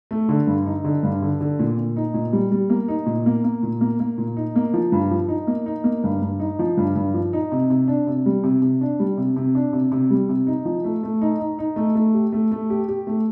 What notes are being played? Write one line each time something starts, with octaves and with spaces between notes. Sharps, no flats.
A3
D3
G2
D#4
D3
G2
D3
D3
A#2
A#2
D#4
A#2
G3
G3
A#3
D#4
A#2
A#3
A#3
A#2
A#3
A#3
A#2
D#4
A#3
F3
G2
F3
D#4
A#3
D#4
A#3
G2
G2
D#4
F3
G2
G2
F3
D#4
C3
C3
D4
C3
G3
C3
C3
D4
G3
C3
C3
D4
C3
C3
G3
C3
D#4
F3
A3
A3
D#4
D#4
D#4
A3
A3
G4
A3
A3
G4
G4
A3